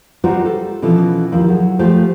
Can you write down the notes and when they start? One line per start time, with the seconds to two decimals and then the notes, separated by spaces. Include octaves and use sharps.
0.24 G3 D#4 F4 F#4 B4 C5
0.46 G3 A4
0.82 B2 E3 F3 C#4 A4
1.32 D#2 F3 E4
1.48 F#3 G#4
1.79 F3 A3 F4 G4 G#4 C5